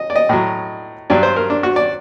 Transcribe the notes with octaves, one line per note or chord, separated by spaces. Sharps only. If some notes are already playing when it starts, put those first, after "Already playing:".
Already playing: D#5
D5
D#5
A2 F#3
G2 F#3 D5
C5
A#4
D4
F#4
D5